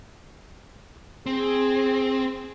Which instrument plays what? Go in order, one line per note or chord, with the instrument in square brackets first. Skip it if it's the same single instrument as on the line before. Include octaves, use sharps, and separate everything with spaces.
[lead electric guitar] C4 [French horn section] G#4